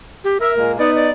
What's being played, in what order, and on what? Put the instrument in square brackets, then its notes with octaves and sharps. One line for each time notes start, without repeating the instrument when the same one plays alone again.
[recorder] G4
[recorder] A#4 [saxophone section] E5
[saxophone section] A#2 G#3 A#3
[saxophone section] B3 D#4 [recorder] D5
[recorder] D5